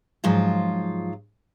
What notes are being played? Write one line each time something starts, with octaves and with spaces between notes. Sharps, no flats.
G#2 F3 F#3 F4